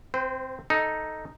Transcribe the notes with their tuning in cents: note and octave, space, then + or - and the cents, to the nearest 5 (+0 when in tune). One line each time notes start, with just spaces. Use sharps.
C4 +0 C5 -35
D#4 +0 A4 +0